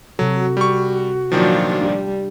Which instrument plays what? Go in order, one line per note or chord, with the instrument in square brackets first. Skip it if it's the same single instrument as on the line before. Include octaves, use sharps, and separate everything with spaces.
[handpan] C3 A4 [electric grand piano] F#3 [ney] F#4
[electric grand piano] G3 C#6
[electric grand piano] A#2 D#3 F3 [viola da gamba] F#3 D4 F4
[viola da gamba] G3 [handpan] D4 G4